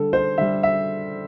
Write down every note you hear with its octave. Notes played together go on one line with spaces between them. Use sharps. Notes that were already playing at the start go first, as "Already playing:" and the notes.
Already playing: D3 G3 A4
C5
D3 G3 E5
E5